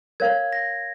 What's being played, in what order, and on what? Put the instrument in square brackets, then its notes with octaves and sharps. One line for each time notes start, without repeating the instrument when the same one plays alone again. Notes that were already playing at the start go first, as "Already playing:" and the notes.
[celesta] A#4 C#5 F5 [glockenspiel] G#6
[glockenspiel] A#6